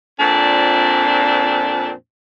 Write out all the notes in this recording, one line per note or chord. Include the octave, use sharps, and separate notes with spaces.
F2 A#2 C4 D4